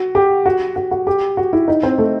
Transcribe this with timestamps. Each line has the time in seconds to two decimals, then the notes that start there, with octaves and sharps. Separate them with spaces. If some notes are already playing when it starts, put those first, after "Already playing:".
Already playing: F#4
0.15 G4
0.46 F#4
0.76 F#4
0.91 F#4
1.07 G4
1.37 F#4
1.53 E4
1.68 D#4
1.83 C4
1.98 A3